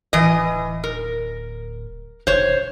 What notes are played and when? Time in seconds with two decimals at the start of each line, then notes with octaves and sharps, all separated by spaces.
0.13 D1 E3 D#5
0.84 A#4
2.27 E1 C5 C#5